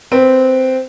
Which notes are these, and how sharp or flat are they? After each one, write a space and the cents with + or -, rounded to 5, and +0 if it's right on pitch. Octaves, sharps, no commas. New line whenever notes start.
C4 -10 B4 +0